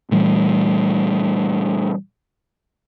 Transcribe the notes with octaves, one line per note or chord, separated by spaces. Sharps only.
A#2 E3 G3 A3